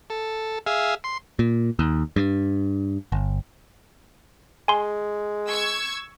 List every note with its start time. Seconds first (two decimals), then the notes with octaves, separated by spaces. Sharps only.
0.10 A4
0.66 G#4 E5 F5
1.04 C6
1.39 A#2
1.79 D#2
2.16 G2
3.12 G1
4.68 G#3 G#5 C6
5.47 C#6 E6 G#6